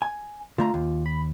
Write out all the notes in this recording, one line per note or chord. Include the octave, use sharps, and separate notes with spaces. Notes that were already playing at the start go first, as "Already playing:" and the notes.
G#5
D3 A3 F4 A#5
D#2
B5